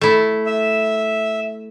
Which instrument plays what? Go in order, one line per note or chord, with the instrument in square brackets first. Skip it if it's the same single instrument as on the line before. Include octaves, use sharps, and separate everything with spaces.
[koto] A3 E4
[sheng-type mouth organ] E5